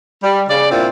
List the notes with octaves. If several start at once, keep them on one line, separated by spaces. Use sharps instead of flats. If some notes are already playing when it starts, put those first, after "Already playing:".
G3
C#3 D5
A#2 C4 D4 E4 F4